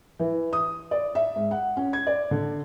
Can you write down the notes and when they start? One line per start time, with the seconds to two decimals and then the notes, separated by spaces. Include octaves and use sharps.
0.19 E3
0.53 D#6
0.91 D5
1.15 E5
1.36 G#2
1.51 F#5
1.77 C#4
1.93 G#6
2.07 D5
2.31 D3